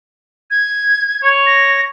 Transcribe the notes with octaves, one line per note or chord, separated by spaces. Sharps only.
G#6
C#5
A#6